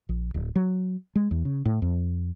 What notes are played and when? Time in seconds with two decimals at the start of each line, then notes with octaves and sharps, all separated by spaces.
0.09 A#1
0.34 D1
0.56 F#3
1.15 G#3
1.31 E2
1.45 C#3
1.65 A2
1.82 F2